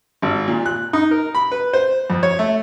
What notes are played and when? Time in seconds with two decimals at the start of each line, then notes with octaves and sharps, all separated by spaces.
0.22 G#1
0.48 A#2
0.66 F#6
0.93 D#4
1.11 A#4
1.35 B5
1.52 B4
1.73 C5
2.10 F2
2.23 C#5
2.39 A3